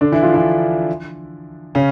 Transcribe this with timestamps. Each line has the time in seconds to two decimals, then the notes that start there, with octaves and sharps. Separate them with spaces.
0.01 D3 D4
0.12 E3 E4
0.23 F3 F4
0.34 E3 E4
1.75 C#3 C#4